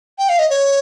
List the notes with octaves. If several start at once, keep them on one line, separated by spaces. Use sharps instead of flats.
G5
F5
D#5
C#5